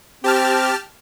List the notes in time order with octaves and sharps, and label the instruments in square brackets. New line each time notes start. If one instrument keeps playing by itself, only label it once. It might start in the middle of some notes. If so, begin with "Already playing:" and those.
[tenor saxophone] C4 [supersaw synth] G4 A5 F6